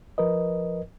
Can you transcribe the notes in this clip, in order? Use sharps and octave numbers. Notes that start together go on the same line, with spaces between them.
F3 A#4 B4 D#5